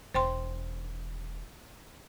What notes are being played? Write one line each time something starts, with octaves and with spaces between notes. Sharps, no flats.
E1 C5 G5 C6